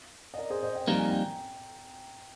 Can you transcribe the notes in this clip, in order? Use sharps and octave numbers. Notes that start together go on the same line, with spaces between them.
D#5
A#4 D5
G#4 C5
C5 D#5
D#5 G5
F2 D#3 G3 A#3 D#4 A#5
G#5
G5 A#5